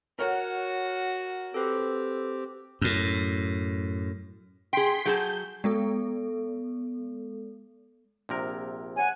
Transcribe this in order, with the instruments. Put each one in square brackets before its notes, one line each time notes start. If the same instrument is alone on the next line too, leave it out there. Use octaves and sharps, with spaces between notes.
[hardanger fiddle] F#4 [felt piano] A#4 C#5 F#5
[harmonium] C4 G4 [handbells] A4 B4
[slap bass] F#2 A2
[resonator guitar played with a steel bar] G#4 G5 [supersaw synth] C6 B6
[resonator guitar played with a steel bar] F#3 G#4 A5 [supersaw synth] G6
[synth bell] G#3 B3 A4
[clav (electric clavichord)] A#1 C3 A#4
[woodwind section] C#5 F#5 G#5